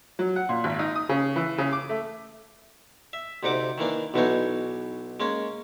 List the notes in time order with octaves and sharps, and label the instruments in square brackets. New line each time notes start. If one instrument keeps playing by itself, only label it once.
[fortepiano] F#3
F#5
A#2
G#1
D#4
D#6
C#3
E3
C#3
D6
A3
[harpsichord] E5
D2 C3 D#4 F#5 D6
D#3 E3 A#3 D4
B1 B2 E3 D4 D#4 C#5
G#3 A#3 C#4